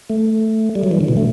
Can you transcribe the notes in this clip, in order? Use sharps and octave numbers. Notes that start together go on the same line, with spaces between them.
A3
G3
F#3
E3
D3
B2
A3